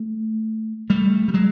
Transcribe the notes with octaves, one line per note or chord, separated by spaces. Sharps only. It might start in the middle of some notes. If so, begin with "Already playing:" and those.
Already playing: A3
G3 A3
G3
F#3 G#3